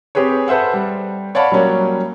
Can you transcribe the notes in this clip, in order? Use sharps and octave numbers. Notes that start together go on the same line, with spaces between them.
C4 G4 G#4 B4 C#5
A4 B4 C5 E5 F#5
G3
C#5 D5 F5 F#5 A5 B5
F#3 G3 A#3 C#4